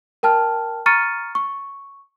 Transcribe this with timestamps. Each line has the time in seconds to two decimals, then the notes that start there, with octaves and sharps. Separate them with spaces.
0.23 A#4 G5 A5 F6
0.86 A#5 C#6 F6 A6 C#7 D#7
1.35 C#6